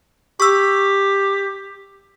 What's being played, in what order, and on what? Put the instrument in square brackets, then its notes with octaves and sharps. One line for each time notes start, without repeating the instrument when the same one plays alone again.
[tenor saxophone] G4 [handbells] C#6 E6